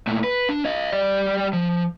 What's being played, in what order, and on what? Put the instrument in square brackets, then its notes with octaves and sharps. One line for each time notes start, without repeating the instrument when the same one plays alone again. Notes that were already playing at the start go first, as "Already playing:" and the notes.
[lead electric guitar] A#2 A3
B4
D4
C#5 D#5
G3 D5
F3